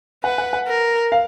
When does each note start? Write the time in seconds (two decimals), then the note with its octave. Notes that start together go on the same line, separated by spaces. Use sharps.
0.24 B4 F#5
0.38 F#5
0.53 F#5
0.68 A#4
1.12 F5